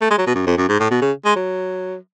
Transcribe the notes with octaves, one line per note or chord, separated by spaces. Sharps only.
A3
G#3
F#3
B2
F#2
F2
F#2
G#2
A2
B2
C#3
G#3
F#3